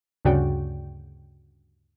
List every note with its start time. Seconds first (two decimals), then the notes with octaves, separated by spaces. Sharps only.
0.25 D2 G2 C#3 F#4 D5 G5